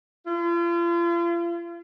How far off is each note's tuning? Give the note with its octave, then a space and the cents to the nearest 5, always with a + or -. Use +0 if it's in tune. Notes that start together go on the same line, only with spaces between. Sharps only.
F4 -40